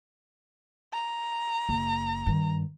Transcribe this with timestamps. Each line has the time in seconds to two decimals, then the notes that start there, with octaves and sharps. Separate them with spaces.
0.93 A#5
1.69 F#1
2.26 G2 D#3